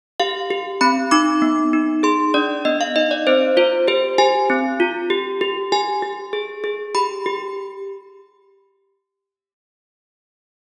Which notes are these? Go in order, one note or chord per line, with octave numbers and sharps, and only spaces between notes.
G4 F5
G4
C4 B5
D#4 D6
B3
D#4
G#4 C6
D4 D5
B3 D#5
F5
D#4 D#5
D5
C4 C5
F4 C5
G4 C5
G4 G#5
C4
F4
G4
G4
G4 G#5
G4
G#4
G#4
G4 B5
G4